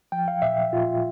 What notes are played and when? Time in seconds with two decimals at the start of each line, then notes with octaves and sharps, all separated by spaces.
0.12 F3 G5
0.28 F5
0.42 A#2 E5
0.73 A#2 F4